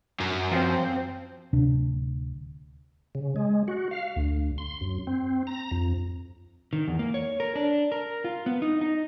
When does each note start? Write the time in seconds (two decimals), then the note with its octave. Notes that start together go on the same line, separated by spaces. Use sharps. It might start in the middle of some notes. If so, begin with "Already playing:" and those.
0.20 F#2
0.51 F3 C4
1.53 D1 D2 C3 D4
3.15 C#3
3.36 G#3
3.68 F#4
3.91 F5
4.16 D2
4.58 C6
4.81 F#2
5.07 C4
5.47 A#5
5.71 F2
6.73 D#3
6.88 E2
6.99 A#3
7.14 C#5
7.40 A#4
7.55 D4
7.92 A#4
8.24 F4
8.46 B3
8.62 D#4
8.81 D#4